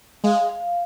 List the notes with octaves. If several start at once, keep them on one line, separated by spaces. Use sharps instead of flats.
G#3 F5
F5